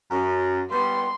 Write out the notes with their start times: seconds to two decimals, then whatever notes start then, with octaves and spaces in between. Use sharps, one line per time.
0.10 F#2
0.71 G3 B3 C6